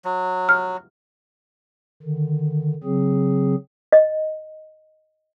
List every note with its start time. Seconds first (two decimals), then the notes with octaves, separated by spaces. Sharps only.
0.05 F#3
0.49 F6
2.02 D3 D#3
2.84 C#3 F#3 C4 G#4
3.92 D#5